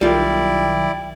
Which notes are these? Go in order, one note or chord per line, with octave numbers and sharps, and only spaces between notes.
B1 D#3 G3 E4 F4 G4 D5 G5